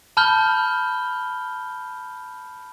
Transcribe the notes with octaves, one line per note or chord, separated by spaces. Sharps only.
A5 B5 F6 G6 G7